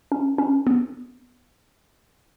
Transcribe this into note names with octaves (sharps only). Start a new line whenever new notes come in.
C#4
C#4
B3